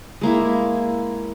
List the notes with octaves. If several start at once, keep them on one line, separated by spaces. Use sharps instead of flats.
G#3 A#3 E4